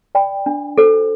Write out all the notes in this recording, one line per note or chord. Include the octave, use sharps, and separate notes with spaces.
D5 G5 B5
D4
F#4 A4 C5